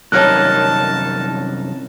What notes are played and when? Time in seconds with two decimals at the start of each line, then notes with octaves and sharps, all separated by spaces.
0.12 C2 F#2 D#4 C#5 A5 F6 F#6